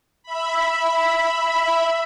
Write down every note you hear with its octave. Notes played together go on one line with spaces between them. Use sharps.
E5 B5